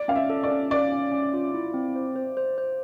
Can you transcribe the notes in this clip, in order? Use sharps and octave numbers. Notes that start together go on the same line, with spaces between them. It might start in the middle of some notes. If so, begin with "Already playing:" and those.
Already playing: D5
C#4 F5
E5
A4
D5
C#4
C#4 D5
C#4
C#4
F4
E4
C4
C5
C5
C5
C5